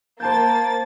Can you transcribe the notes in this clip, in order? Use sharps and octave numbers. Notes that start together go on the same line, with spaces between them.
A#3 C5 A5 G6 A6